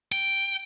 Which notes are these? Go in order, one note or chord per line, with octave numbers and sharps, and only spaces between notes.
G5